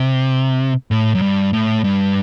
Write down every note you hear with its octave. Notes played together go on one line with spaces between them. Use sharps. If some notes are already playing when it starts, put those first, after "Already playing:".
Already playing: C3
A2
F#2
G2
A2
G2